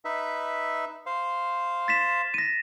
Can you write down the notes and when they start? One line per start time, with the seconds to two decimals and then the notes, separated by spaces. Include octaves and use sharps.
0.05 D#4 B4 E5
1.06 C5 F5
1.88 A6 B6 E7
2.34 A#6 D#7